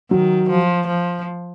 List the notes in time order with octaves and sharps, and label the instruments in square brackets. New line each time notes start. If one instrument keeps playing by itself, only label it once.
[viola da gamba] D#3 [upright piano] F#3
[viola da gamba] F3
F3